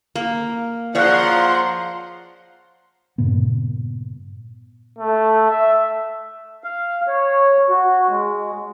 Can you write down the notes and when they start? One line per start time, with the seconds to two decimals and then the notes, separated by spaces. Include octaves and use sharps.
0.16 A#3
0.95 F3 G#4 C#5 D5 F#5 A#5 C6 F#6
3.18 G2 A#2 C#3 B3
4.99 A3
5.51 E5
6.64 F5
7.07 C#5
7.69 F#4
8.09 G#3